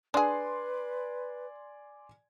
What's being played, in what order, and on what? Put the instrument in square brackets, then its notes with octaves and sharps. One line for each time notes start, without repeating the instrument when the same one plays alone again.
[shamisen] D4 G#4 [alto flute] B4 [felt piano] D5 G#5 C6